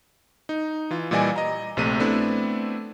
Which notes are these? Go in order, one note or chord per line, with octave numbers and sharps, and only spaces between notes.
D#4
E3 F4
A#2 E3 G3 D5 D#5 G#5
D#5 A#5
A#1 C3 A3 D#7
A3 B3 C4 D4 E4